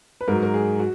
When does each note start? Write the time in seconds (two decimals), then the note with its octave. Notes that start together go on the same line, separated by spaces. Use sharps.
0.21 B4
0.28 G#2 F#3 A#4
0.43 A#4
0.54 G#4
0.80 F#4